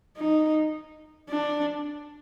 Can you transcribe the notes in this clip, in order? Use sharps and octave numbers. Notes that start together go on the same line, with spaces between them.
D#4
D4